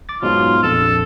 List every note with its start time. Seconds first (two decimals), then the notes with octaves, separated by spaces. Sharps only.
0.09 D6 A6
0.22 G#2 B2 F#3 F4
0.63 A#1 F2 A4